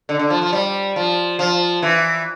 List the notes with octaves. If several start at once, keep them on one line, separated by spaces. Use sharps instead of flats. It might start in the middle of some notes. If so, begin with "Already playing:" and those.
D3
D3
F3
F3
G3
F3
F3
E3